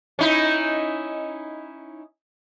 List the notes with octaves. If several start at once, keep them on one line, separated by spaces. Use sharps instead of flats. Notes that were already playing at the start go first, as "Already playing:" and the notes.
C#4 D#4 E4